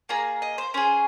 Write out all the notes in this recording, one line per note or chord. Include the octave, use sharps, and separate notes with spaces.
A#3 F4 G#4 A#5
D#5
C5
C#4 G#4 C5